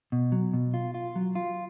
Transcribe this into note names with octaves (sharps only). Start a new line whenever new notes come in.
B2
F#3
B2
F4
F4
F#3
F4